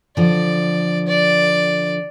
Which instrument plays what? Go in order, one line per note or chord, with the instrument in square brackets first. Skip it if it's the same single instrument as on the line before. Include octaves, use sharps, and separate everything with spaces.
[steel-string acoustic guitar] D3 F3 [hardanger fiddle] D5
[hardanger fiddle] D5